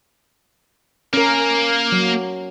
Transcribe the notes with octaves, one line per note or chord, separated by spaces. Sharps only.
A#3 C#4 A#4
F#3